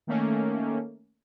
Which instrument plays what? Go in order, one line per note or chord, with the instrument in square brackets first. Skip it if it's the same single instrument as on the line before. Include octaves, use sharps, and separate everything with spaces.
[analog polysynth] D#3 A3 A#3 C#4